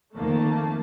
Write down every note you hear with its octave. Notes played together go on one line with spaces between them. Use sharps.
F2 D#3 A3 A#3 A5